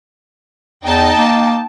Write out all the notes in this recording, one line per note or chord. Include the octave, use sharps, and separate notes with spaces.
E2 D#4 G5 A5
A#3